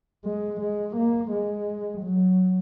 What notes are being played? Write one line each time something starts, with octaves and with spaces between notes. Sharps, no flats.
G#3
G#3
A#3
G#3
F#3